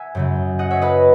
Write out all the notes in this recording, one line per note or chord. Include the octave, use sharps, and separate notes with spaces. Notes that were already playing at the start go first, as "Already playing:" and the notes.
Already playing: E5 F#5 G#5
F#2 C#3 G#3
D#5 F#5
C#5 E5
B4 D#5